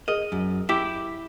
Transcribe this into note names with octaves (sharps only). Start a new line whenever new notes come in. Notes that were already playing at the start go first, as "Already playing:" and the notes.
G#4 A#4 D#5
F#2
E4 G4 D6 B6